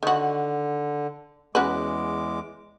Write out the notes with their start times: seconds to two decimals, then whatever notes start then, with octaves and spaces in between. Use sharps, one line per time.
0.03 D3 D#3 F#4
1.55 E2 G#3 C#4 F#4 B4 D6